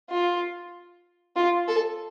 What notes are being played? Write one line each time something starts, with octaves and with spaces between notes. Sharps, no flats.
F4
F4
A4